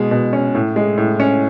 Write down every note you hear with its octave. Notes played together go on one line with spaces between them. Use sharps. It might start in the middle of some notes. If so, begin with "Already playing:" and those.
Already playing: B2 G#3
B2
C#4
A2
G#3
A2
C#4